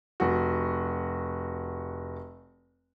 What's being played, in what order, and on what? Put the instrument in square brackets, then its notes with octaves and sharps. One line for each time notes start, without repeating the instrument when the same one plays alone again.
[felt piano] F1 F#4